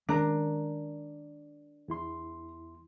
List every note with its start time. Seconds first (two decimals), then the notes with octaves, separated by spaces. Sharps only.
0.09 D#3 G#3 C#4 D4 A#4
1.88 E2 E4 C6